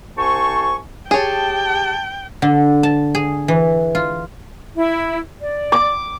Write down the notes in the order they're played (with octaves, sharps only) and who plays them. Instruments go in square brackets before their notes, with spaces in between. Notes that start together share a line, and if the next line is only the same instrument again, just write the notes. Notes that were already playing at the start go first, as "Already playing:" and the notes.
[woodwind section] C2 C5 G#5 A5 C#6
[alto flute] G4 [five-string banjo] G#4 C#5 [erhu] G5 [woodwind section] A5
[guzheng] D3
A5
G#4
E3
F4
[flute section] E4
D5
[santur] D6